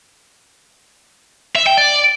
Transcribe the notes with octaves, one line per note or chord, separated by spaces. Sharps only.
E5
G5
D5